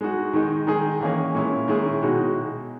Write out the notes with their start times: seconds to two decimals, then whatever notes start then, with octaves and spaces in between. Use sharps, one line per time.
0.01 G#3 D#4 F#4
0.33 D#3 G#3 D#4
0.67 D#3 G#3 D#4 G#4
1.01 E3 A#3 C#4 G#4
1.35 A#2 G#3 C#4 E4
1.68 D#3 G#3 C#4 E4 G#4
2.02 B2 G#3 D#4 F#4